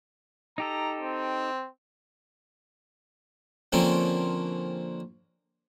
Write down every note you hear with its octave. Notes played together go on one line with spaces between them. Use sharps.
D#4 G4 A4 A#5
C4
D3 F3 A#3 C4 C#4